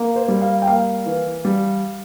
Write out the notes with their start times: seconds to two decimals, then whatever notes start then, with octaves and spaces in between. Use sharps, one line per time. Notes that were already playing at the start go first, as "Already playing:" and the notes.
Already playing: A#3
0.16 C5
0.28 G3
0.41 F5
0.62 G5
0.67 A#3 F5
1.06 E3
1.45 G3